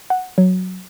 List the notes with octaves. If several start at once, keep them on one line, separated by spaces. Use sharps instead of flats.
F#5
F#3